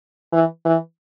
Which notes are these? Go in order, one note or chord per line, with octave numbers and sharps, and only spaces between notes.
E3
E3